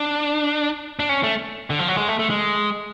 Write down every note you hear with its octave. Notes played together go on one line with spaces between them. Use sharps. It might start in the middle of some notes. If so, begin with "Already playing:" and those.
Already playing: D4
D4
C#4
A3
D3
F3
F#3
G#3
A3
A3
G#3